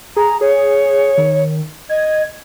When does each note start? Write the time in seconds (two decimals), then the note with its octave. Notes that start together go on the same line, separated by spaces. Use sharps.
0.16 G#4 A#5
0.41 G#4 C#5
1.18 D#3
1.89 D#5 G#6